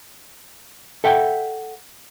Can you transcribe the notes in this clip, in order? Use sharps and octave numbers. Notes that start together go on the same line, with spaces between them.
A4 E5 F#5 G5